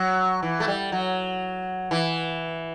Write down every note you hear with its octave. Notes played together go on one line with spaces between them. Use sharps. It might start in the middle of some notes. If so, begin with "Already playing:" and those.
Already playing: F#3
E3
A3
G3
F#3
E3